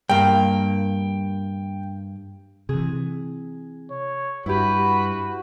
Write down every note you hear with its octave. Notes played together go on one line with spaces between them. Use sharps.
G2 A#3 G5
C3 E3 G#4
C#5
G2 E4 F#4 G4 B4